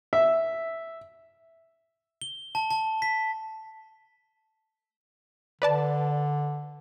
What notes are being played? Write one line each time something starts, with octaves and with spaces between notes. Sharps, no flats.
E5
G7
A5
A5
B6
D3 B4 D5 A5